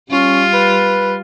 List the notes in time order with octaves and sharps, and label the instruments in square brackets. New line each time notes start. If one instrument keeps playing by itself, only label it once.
[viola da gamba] G3 F4 [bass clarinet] C#4
[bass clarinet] B4